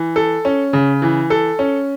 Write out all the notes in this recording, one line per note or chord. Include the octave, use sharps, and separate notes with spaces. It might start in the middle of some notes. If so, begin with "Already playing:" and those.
Already playing: E3
A4
C#4
C#3
E3
A4
C#4